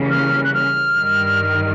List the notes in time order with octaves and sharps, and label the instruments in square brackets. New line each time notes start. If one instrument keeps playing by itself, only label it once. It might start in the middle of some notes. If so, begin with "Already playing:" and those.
Already playing: [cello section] C#3 E3 G3 A#3 C#4
[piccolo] F6
F#6
F6
[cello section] G2 D#3 G3